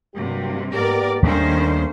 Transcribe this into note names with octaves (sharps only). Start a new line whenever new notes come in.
G2 C3 F#3 A#3 G4
G#2 A#3 B3 G4 A#4 D5
D#2 D#3 G3 A3 A#3 C#4 D4 C5